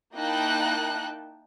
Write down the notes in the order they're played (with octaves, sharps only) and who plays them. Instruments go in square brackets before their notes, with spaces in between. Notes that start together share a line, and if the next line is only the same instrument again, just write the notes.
[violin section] A#3 D#4 E4 G5 A5 F#6